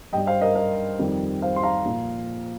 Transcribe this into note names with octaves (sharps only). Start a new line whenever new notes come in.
G2 G3 D#5 G5
C5 F5
A#4 D#5
A#4 D#5
F2 D#3 G3
C5 F5
C6
F5 A#5
A#2 F3